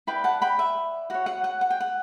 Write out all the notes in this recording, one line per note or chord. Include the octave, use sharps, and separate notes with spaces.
E4 B4 D5 G5 B5
F#5 A5
G5 B5
E5
F#4 C#5 F#5
F#5
F#5
F#5
G5
F#5